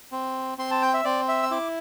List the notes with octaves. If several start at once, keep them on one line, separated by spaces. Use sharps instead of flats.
C4
C4 C6
A5
G5
E5
C4 D5
E5
E6
E4 D6